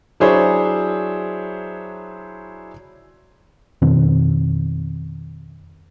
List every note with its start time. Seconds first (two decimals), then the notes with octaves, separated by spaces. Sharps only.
0.20 F#3 D4 E4 G#4 C5 C#5
3.82 F2 B2 D#3 C4